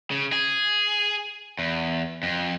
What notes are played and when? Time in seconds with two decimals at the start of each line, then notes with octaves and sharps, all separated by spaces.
0.11 C#3
0.32 G#4
1.59 E2
2.23 F2